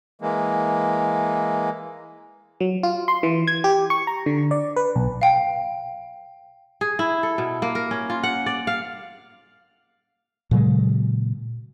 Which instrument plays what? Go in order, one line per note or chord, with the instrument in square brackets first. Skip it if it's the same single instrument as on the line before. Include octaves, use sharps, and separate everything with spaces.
[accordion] E3 G#3 A#3
[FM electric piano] F#3
F4
C6
E3
G#6
G4
C#6
A#5
D3
D5
B4
B1
[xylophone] F5 G5
[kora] G#4
E4
A4
B2
A#3
A#4
C#4
F4
F#5
D5
F5
[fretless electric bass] A#2 C#3 F#3 G#3